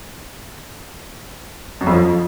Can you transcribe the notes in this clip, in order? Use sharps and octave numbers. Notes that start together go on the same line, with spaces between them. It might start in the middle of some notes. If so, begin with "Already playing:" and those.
F#2
F2
F3